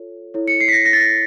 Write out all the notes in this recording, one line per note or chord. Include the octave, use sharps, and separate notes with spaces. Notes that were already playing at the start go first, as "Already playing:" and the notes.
Already playing: F4 A4 C#5
E4 A4 C#5
C#7
C7
B6
A#6
A#6
A6
A#6